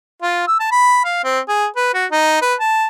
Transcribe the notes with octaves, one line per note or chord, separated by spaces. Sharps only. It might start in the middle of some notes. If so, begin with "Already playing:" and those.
F4
E6
A5
B5
F5
C4
G#4
B4
F#4
D#4
B4
A5